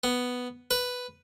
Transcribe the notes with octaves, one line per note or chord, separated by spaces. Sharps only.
B3
B4